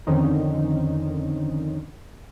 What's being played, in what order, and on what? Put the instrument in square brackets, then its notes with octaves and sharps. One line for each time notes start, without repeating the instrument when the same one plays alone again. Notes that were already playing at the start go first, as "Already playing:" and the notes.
[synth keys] F2 D3 D#3 C4 C#4 D#4